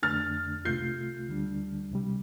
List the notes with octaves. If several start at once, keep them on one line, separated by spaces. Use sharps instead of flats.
F2 D3 A3 D4 F6 A6
C2 C3 A3 F4 G6 C7
D2 D3 G3 D4
C2 C3 G3